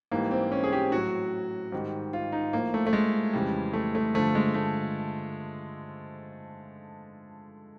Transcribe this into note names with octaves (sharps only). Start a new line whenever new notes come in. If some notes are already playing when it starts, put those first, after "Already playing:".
G#2 E3 G3 A#3
C4
C#4
G#4
G4
A2 F#3 F#4
G#2 D#3 G3
F4
D#4
A2 F3 A#3
A3
A3
G#3
F2 C#3 E3 G3
A3
A3
G2 D3 F3 A3
G#3
A3